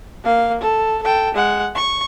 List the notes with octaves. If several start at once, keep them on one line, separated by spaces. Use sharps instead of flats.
A#3 F5
A4
A4 G5
G#3 F#5
C#6